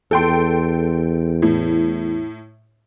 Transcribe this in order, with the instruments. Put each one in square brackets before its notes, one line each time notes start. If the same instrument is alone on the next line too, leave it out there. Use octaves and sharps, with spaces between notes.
[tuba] E2 [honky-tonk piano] A4 G5 C6
[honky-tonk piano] A2